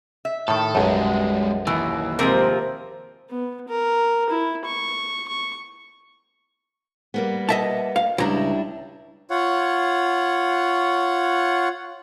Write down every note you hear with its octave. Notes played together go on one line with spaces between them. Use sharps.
E5
A2 D#3 A4
B1 F#2 G3 G#3
D#2 E3
C3 F3 G#3 C4 A#4
B3
A#4
E4
C#6
C#6
G3 A#3 B3
D#5 E5 A5
F5
C#2 G3 D4 E4 A#5
F4 C#5 F#5